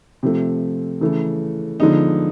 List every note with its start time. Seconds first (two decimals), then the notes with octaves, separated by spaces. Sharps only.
0.23 C3 F3 A3
1.01 C#3 E3 A3
1.80 D3 F3 G#3 B3 D#4